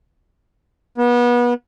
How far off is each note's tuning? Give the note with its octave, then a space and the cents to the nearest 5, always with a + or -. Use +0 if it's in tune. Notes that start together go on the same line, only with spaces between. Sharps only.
B3 -30